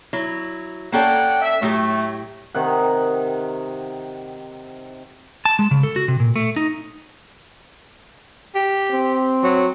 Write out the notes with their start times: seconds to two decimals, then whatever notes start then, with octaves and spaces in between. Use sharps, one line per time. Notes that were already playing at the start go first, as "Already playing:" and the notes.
0.13 F#3 E4
0.92 A#3 C#4 A4 D5 F#5 G5
1.42 E5
1.62 A2 F#3 A3 G4
2.55 C3 D#3 F#5
5.45 A5
5.59 G#3
5.71 C#3
5.83 A4
5.96 F#4
6.08 C3
6.20 A#2
6.36 A3
6.56 D#4
8.55 G4
8.91 C4
9.44 F#3